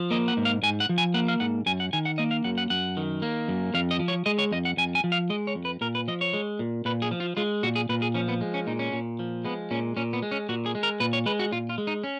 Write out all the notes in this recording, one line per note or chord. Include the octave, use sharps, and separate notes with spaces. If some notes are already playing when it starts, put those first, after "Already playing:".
Already playing: F3
A#3 D#5
F#5
G#2
F5
G#2 G#5
F#5
F3
G#5
A#3 F#5
F5
G#2 F#5
F#2 G#5
F#5
D#3 G#5
F#5
A#3 D#5
F5
F#2 F#5
F#5
F#2 F#5
D#3
A#3
F#2
F2 F5
D#5
F3
C#5
G#3 D#5
C#5
F2 D#5
F#5
F2 G#5
G#5
F3
F5
G#3 D#5
C#5
F2
B4
A#2 A#4
B4
F3 D#5
C#5
G#3
A#2
A#2 B4
G#4
F3
F4
G#3 F4
A#2 F#4
G#4
A#2 B4
G#4
F3 C#4
B3
G#3
C#4
A#2 D#4
C#4
A#2
F3
G#3 B3
A#2 C#4
A#2 C#4
B3
G#3
C#4
A#2 F#4
G#4
G#3
A#4
A#2 B4
C#5
G#3 B4
F#4
A#2 F4
F4
G#3
D#4
C#4